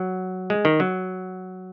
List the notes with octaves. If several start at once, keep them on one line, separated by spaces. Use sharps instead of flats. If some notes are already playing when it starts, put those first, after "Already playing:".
Already playing: F#3
G#3
D#3
F#3